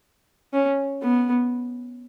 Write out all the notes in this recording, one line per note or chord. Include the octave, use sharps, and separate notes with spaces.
C#4
B3